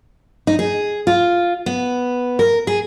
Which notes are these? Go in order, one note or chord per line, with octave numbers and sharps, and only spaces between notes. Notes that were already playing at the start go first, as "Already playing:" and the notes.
D#4
G#4
F4
B3
A#4
G#4